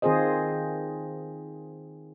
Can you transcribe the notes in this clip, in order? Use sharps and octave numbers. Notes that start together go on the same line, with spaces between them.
D#3 C4 F4 G#4 C5 D#5